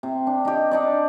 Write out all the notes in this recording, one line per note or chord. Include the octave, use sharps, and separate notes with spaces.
C3
D4
D#4 G4
D4 D#4 D5